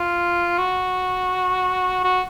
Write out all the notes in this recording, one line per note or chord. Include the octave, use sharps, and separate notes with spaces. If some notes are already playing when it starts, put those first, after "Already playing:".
Already playing: F4
F#4
F#4